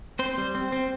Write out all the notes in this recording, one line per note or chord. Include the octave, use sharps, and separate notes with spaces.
C4 C5
G3
C4
C4